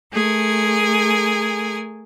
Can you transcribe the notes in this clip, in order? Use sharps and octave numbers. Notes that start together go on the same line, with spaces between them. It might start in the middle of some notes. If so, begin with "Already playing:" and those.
A3 G#4 A#4 G#5